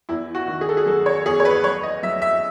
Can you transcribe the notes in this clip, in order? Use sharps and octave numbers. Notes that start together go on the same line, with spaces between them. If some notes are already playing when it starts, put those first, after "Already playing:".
E2 E4
F#4
D#3
G#4
A4
G#4
F#3 A4
C#5
E2 G#4
C#5
B4
F#3 C#5
D#5
F#3 E5
E5